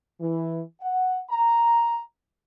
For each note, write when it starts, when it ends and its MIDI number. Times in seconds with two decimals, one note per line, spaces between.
0.20 0.61 52
0.81 1.20 78
1.31 2.01 82